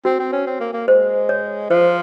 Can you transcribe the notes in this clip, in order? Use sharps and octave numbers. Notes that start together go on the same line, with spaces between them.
C4 F#4
C4
C#4
C4
A#3
A#3
G#3 C5
C#5
F3 C5